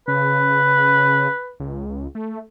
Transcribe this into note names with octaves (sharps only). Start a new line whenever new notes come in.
C#3 B4
C#2
A3